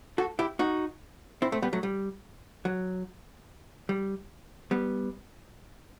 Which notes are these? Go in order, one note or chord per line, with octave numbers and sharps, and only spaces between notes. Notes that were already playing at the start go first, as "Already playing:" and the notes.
F#4 A4
E4 G4
D#4 F#4
C4 E4
A3 C4
G3 B3
F#3 A3
G3
F#3
G3
G3 B3